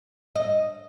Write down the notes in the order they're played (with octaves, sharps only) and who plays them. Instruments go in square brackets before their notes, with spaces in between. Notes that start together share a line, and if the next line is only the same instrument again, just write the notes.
[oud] D#5